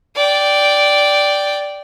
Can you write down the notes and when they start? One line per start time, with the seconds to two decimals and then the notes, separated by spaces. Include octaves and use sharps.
0.16 D5 G5